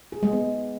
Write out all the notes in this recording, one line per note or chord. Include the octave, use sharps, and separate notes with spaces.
G#4
G#3
B3